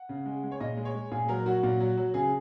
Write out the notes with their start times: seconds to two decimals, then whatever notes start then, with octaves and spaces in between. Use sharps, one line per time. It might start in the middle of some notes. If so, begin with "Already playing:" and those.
Already playing: F#5
0.09 C#3
0.26 G#3
0.43 G#3
0.51 C#5
0.60 A#2 D#5
0.77 G#3
0.85 C#5
0.95 G#3
1.11 A#2 G#4
1.28 F#3 A#4
1.46 F#3 F#4
1.63 A#2
1.80 F#3
1.97 F#3
2.14 C#3 G#4